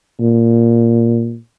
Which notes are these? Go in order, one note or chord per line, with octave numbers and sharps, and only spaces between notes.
A#2